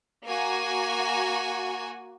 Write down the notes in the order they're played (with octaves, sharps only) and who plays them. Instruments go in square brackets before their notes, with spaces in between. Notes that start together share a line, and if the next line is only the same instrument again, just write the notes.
[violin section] A#3 F#4 G#5